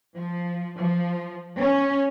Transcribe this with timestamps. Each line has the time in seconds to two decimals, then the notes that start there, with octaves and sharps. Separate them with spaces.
0.17 F3
0.81 F3
1.62 C#4